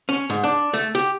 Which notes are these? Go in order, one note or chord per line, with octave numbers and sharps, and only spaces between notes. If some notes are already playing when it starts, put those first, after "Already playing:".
C#4
G#2
D4
A3
G4